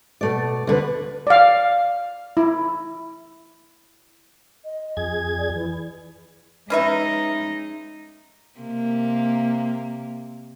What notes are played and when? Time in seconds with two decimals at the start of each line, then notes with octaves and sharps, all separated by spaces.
0.21 B2 A3 D5
0.67 D2 D3 B4
1.27 D5 F5
2.37 E4
4.65 D#5
4.97 F2 G#4 G#6
5.38 D5
5.53 E3
6.70 G#3 C#4 D#4 B4 E5
8.59 C3 A#3